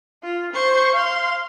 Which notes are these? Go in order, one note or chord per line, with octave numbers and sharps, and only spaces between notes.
F4
C5 C#6
F5 C6